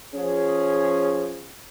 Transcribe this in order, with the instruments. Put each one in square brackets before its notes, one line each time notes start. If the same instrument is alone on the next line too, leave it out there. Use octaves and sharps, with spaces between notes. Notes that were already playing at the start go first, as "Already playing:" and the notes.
[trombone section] F3 C#4 G#4